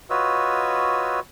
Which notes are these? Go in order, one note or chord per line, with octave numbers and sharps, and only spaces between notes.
F4 F#4 B4 C#5 D#5 E6